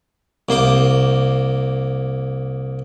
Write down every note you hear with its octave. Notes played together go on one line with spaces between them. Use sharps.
C2 A#3 C5 D6